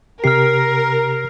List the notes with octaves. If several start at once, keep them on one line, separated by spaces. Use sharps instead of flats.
C3 G4 A#4 F6 C7